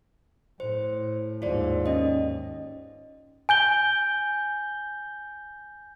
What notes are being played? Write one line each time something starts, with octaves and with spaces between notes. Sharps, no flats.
A2 C5
D#2 G#2 F4 C5 D5
C#4 D#5
G#5 G6 G7